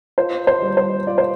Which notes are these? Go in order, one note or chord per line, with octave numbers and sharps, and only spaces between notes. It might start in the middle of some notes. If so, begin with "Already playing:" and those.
F4 C5
C5
G3
C5
F4 D5
C5